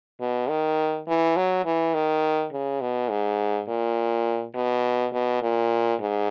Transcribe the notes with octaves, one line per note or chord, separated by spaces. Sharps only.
B2
D#3
E3
F#3
E3
D#3
C#3
B2
G#2
A#2
B2
B2
A#2
G#2